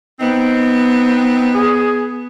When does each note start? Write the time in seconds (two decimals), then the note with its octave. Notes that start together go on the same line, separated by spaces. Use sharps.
0.20 B3 C4 D#4
1.54 G#4